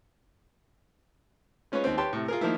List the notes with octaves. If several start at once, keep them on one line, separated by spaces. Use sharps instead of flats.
G#3 C#4 F4 B4 C#5
D#2 C4
G4 B4 C#5 G5 A5 C6
A2 C3
F4 G#4 A#4
D#3 F3 A#3 D#4 E4